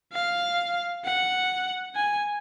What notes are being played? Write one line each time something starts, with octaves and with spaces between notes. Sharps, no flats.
F5
F#5
G#5